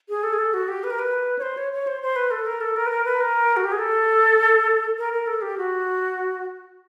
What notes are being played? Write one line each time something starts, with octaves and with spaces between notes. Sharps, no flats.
G#4
A4
G#4
A4
F#4
G4
B4
A#4
B4
C#5
C5
C#5
C#5
C5
C5
B4
A4
A#4
A4
A#4
B4
A#4
B4
A#4
F#4
G4
G#4
A4
A#4
A#4
A4
G4
F#4